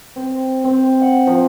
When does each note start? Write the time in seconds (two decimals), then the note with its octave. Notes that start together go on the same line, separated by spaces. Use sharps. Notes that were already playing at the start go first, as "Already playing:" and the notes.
0.16 C4
0.64 C4
1.01 F#5
1.27 F3